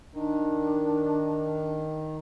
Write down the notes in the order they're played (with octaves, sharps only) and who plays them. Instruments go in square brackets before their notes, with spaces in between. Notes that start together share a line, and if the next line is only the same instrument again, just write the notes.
[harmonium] D#3 [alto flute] D4